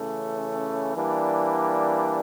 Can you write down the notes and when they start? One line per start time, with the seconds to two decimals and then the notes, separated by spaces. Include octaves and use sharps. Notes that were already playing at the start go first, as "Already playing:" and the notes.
Already playing: C#3 E3 A3 C#4
0.96 E3 G3 A#3 D4